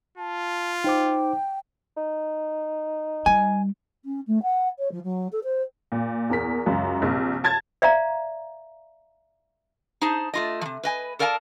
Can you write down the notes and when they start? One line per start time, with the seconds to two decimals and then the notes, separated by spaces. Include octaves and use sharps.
0.18 F4 A5
0.84 D#4 C5 G5 D6
1.97 D#4
3.26 G3 G#5
4.05 C#4
4.27 A3
4.42 F#5
4.78 C#5
4.91 F3
5.04 F#3
5.32 A4
5.43 C5
5.92 A#2
6.30 E2 A#4 B6
6.66 C#2 F#2
7.02 A#1 C3
7.44 A5 G#6 A6
7.82 D5 E5 F5 A#5
10.01 D#4 G#4 C5 A5
10.34 A3 F4 D#5
10.61 C3 F3
10.83 B4 D#5 G#5
11.19 A4 A#4 D5 F5 G#5 A5